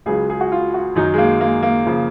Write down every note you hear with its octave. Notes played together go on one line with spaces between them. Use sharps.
C#2 C#3 F#3 G#4
G#4
F#4
F4
F#4
F#2 D#3 F#3 D#4
G#3
A#3
A#3
A#3
C#3 F3